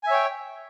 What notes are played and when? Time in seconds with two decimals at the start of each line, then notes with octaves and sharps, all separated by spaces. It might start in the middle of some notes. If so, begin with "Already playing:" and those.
0.03 G#5
0.07 E5
0.10 C#5
0.14 G5